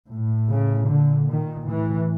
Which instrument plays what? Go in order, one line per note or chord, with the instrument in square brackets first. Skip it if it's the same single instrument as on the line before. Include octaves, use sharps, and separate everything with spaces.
[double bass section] A2
C#3
A#2 D3
D#3
A2 E3